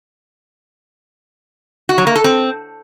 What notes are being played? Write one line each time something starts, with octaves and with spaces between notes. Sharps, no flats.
F#4
F#3
A#3
A4
C4